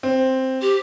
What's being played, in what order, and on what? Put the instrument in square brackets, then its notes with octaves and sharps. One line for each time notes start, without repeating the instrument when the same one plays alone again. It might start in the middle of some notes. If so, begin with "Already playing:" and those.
[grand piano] C4
[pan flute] G4